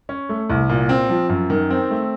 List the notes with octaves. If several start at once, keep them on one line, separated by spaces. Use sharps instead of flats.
C#4
A3
C2
A#2
C4
F3
F#2
D#3
C4
A3